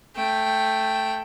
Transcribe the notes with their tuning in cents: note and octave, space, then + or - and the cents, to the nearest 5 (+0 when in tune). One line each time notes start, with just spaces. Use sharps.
A3 +0 G5 +0